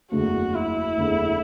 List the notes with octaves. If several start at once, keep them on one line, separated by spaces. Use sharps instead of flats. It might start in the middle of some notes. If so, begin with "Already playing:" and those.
F#1 E2 D3 A3 F#4
E4
F#1 E2 D3 A3